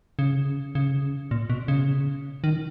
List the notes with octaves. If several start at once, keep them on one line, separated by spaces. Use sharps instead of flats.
C#3
C#3
A#2
B2
C#3
D#3